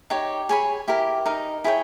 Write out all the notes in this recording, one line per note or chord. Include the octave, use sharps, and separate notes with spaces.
D#4 G4 C#5
G#4 C#5 G#5 B5
E4 G4 A#4
D#4 A#4 D#5
E4 G#4 C#5 G5